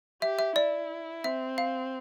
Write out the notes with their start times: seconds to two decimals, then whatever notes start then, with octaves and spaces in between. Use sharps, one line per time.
0.22 G4 E5
0.39 E5
0.56 E4 D5
1.24 C4 E5
1.58 F5